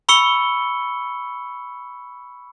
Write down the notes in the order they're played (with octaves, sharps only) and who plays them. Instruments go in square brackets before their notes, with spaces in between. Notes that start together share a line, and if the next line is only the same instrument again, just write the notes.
[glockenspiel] B5 C#6 E6 C#7 G7